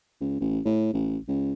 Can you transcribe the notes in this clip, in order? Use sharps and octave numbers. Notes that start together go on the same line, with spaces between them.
C#2
A1
A2
A1
C#2